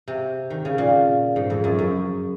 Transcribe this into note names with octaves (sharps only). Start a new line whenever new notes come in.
C3
D#3
C#3
A#2
G#2
F2
F#2
F#2